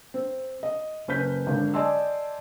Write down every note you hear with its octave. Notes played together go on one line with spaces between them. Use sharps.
C4
D#5
F#1 C#4 B4 B5 G6 B6
G#1 D3
D5 D#5 G#5 A5 C6 E6